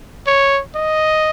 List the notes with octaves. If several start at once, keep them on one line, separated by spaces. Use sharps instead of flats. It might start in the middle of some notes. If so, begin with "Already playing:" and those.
C#5
D#5